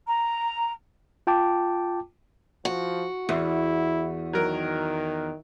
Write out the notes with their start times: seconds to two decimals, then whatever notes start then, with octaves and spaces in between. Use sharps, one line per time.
0.08 A#5
1.27 F4 G5 A5 D6
2.65 F3 F#4
3.29 E2 E4
4.33 D#3 F#3 A#4